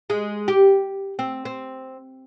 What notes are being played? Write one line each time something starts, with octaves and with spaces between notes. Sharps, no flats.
G#3
G4
C4
C4